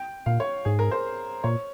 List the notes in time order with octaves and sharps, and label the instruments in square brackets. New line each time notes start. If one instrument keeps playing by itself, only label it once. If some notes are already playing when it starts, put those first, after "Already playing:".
Already playing: [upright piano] G5
[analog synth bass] A#2 [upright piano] F5
[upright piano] C#5
[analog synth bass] G#2 [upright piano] G#4
[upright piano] A#4
C5
[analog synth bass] A#2 [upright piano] C#5